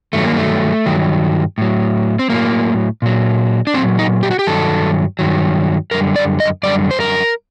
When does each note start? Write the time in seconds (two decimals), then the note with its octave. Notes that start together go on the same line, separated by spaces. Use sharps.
0.13 G2 D#3 F#3 A3
0.25 A#3
0.37 A3
0.86 G2 D#3 F#3
1.58 A2 F#3
2.19 C4
2.30 A2 F#3 A#3
3.02 A#2 F#3
3.67 D4
3.74 A#2 F#3 C4
3.99 D#4
4.23 G4
4.31 F#4
4.39 G4
4.46 G2 D#3 F#3 A4
5.19 G2 D#3 F#3
5.91 F#2 D3 G3 A#4
6.16 D5
6.40 D#5
6.63 F#2 D3 G3 D5
6.91 C5
7.00 A#4